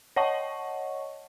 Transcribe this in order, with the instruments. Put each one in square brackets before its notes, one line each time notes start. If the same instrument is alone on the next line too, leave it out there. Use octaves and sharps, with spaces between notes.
[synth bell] C#5 D#5 F#5 A5 C#6